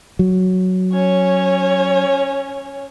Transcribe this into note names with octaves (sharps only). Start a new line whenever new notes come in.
F#3
C#4 C#5